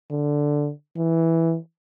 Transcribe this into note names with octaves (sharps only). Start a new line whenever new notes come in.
D3
E3